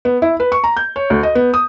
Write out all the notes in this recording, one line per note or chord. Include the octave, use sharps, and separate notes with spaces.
B3
E4
B4
C#6
A#5
G6
C#5
D2
D#5
B3
D#6